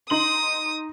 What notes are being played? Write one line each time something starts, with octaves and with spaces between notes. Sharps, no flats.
D#4 C6 D#6 F#7